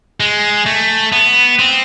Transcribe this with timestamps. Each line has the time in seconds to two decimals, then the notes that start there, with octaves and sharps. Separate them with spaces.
0.20 G#3
0.66 A3
1.12 B3
1.59 C4